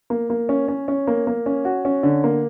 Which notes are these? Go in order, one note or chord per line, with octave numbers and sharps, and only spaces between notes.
A#3
A#3
C#4
C#4
C#4
A#3
A#3
C#4
F#4
C#4
D3
A#3